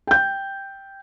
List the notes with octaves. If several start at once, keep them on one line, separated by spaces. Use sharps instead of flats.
G5 G6